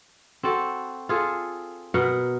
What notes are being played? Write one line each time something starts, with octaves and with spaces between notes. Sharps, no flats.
C4 F#4 A4
F4 G#4 A4
B2 A#4 F#5